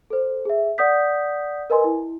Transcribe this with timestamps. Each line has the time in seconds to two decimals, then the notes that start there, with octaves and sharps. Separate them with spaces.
0.10 A4 C5
0.45 G#4 E5
0.78 D5 F#5 D#6 G6 B6
1.70 A#4 B4 D#5 G#5 C6
1.84 E4